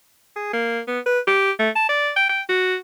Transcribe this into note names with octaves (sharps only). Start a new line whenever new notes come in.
G#4
A#3
B3
B4
G4
A3
A5
D5
G5
G5
F#4